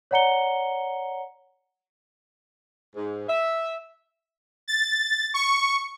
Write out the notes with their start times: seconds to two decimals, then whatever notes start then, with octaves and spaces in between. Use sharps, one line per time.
0.11 C#5 D5 F#5 A#5 C#7 G7
2.95 G#2
3.29 E5
4.68 A6
5.34 C#6